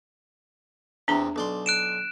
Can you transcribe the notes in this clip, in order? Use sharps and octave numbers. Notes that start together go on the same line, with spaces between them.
E2 C3 D4 A#5
B1 D5 C6
F#6 D7 E7